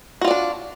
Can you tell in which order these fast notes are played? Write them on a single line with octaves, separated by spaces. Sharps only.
F#4 F4 D5 D4